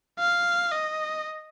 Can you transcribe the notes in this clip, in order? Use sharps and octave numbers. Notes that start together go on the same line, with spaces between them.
F5
D#5